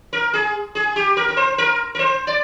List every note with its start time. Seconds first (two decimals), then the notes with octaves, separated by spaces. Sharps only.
0.13 A#4
0.34 G#4
0.75 G#4
0.96 G4
1.17 A#4
1.29 A#4
1.37 C5
1.58 A#4
1.95 A#4
1.99 C5
2.27 D5